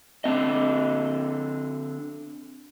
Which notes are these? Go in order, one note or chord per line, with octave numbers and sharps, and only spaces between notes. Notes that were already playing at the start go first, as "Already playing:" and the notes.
D3 C4 D#5